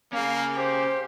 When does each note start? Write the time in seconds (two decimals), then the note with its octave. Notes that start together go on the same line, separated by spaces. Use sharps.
0.13 A#3 C#4 G#4 F5
0.56 G4 C5